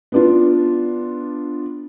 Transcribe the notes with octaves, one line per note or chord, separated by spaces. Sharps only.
B3 D4 F4